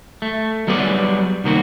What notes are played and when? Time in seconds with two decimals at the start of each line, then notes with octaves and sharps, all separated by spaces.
0.22 A3
0.67 F#3 G3 B3 G#4 D5
1.44 C2 D#3 A#3 F#4